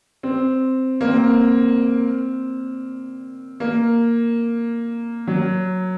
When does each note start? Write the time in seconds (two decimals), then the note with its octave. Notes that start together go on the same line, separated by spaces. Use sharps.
0.23 C4
1.01 A#3
1.07 C4
3.60 A#3
5.27 F#3